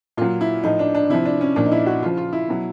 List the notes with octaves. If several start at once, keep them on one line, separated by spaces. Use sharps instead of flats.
A#2 F#3 F4
E4
A2 F3 D#4
D4
D4
C3 F3 E4
D4
C#4
A#2 F3 D4
D#4
E4
F#4
C#3 F3 F4
F4
E4
B2 F#3